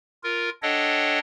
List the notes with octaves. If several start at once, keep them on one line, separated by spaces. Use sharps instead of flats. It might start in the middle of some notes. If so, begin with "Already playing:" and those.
F4 A#4
D4 A4 C#5 D#5 F#5 G5